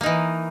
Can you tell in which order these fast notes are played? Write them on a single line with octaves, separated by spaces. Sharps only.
A#3 D#4 E3